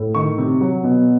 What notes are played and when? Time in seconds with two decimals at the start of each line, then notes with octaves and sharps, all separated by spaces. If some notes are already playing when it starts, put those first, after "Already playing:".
Already playing: A2
0.15 D#3 C#6
0.38 C3
0.61 F#3
0.84 B2